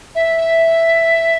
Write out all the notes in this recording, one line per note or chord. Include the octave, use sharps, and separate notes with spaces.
E5